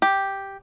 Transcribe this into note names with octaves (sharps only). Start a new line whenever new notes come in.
G4